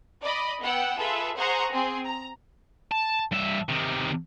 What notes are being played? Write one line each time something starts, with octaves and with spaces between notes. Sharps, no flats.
D5 D#5 B5
B3 F#5 G5 E6
F4 G#4 A4 B4 E5
G#4 C5 F#5 A#5 C#6 D#6
C4 G#4
A#5
A5
G2 E5
C3 D#3